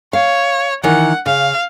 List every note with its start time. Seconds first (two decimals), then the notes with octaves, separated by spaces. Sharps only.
0.13 C#5 F5
0.84 D#3 E3 F#5
1.26 C#3 F5